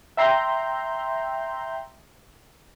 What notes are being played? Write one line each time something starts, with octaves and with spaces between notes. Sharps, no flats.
E5 G5 A#5 C6 G6